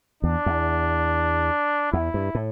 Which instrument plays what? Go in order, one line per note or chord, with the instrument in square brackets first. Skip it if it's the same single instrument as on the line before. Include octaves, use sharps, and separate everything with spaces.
[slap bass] E2 [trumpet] D4
[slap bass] E2
[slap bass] E2 [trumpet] E4
[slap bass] G2
A2